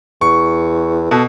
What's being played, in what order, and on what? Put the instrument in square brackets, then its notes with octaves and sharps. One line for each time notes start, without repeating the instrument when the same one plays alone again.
[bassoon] E2 [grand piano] C#6
[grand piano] B2 [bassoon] A4